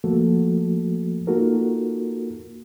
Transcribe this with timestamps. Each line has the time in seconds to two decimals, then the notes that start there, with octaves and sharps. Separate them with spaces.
0.04 F3 A3 A#3 F#4 A4
1.27 A#3 D#4 F4 F#4 A4 A#4